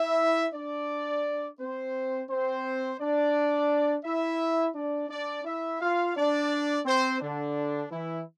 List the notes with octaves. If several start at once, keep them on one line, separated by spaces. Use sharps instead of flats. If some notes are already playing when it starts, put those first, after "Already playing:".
Already playing: E4 E5
D4 D5
C4 C5
C4 C5
D4 D5
E4 E5
D4 D5
D4 D5
E4 E5
F4 F5
D4 D5
C4 C5
D3 D4
E3 E4